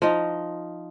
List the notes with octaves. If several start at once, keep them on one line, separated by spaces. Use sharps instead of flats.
F3 D#4